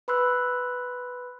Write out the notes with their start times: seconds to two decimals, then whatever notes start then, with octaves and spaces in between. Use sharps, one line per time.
0.08 B4 B5 C6 E6 F#6